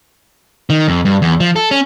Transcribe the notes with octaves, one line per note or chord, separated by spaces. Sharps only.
D#3
F2
G2
E2
F3
A4
C#4